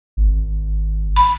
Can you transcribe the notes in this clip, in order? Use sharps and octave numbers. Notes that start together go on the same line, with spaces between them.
G#1
B5